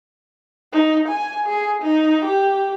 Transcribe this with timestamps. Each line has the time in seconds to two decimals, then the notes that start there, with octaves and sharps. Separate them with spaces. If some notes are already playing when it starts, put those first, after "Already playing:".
0.72 D#4
1.08 G#5
1.47 G#4
1.82 D#4
2.25 G4